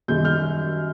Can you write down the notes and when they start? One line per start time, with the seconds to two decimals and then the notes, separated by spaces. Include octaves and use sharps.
0.08 F#2 D#3 G3 G6
0.25 F6 G6